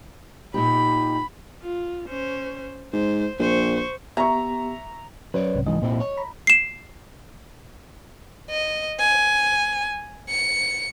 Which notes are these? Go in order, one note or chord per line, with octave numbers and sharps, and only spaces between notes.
A#2 D#4 G4 B5
F4
C#4 C5
G#2 C5
A#1 C5 C#6
B3 G4 E5 A#5 C#6
F#3 C#4 B4 C#5 D5
C2 G#2 C3
G#2 E3 D#5
A#2 C4 E4
C#5
A#5 B5
C7 E7
D#5
G#5
C#7